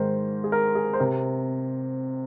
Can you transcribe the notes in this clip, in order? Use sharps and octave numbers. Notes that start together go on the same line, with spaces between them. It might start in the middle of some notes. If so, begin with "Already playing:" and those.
Already playing: G#2 D#3 G#3 A#4 C5
G#4
A#4
G#4
C5
C3 A#4